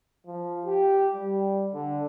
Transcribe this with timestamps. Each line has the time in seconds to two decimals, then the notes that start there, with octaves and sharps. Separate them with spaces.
0.27 F3
0.66 G4
1.14 G3
1.74 D3